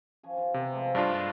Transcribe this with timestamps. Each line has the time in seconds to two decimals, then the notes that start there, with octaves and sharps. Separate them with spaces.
0.23 F3 C#4 G#5
0.37 F4 G4 F5
0.54 C3 E3 B3 C4
0.73 F3 G#3 A3
0.95 G2 D4 F4